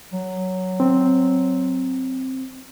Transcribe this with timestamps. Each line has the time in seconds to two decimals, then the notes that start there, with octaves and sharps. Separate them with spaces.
0.13 F#3
0.80 C4